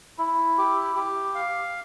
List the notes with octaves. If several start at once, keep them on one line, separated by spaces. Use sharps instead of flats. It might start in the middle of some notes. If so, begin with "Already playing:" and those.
E4
G4
G4
F5